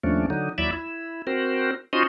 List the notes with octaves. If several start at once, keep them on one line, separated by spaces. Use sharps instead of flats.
D#2 F3 A3 C#4 D4
D3 F#3 D#4
D#2 F#3 E4 D5 E5
E4
C4 F#4 A#4 C5
C#4 D#4 F4 F#4 C5 D#5